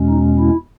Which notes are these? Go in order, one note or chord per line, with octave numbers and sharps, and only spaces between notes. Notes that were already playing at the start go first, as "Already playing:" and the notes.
Already playing: E2 B2 G#3 C#4
D#4
E4